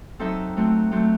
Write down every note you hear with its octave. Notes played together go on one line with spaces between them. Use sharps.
F#3 C4 D#4 A4 E5
F#3 A3 C4
F#3 A3 C4